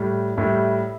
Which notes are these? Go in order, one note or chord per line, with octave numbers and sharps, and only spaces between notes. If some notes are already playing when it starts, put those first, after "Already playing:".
Already playing: A2 G3
A2 G3 E4